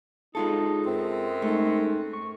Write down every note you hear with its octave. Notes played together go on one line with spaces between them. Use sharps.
G#3 D#4 F4 A4
F#2 C4
G#3 A3 D#4
C#6